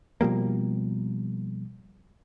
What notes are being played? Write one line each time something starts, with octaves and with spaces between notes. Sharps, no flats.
B2 F3 G3 A#3